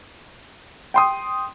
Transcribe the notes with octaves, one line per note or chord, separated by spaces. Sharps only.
G5 C6 D#6